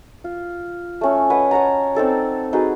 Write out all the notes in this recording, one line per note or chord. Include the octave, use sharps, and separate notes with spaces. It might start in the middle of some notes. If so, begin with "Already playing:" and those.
F4
A3 C#4 A4
B4 D#5 F#5 G#5
C#5 F#5 A5 A#5
C4 D#4 A4 D5
D#4 F#4 G#4 B4